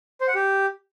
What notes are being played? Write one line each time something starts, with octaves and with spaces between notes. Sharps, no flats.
C5
F#5
G4